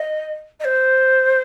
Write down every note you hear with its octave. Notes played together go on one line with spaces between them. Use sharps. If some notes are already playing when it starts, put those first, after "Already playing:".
Already playing: D#5
D#5
C5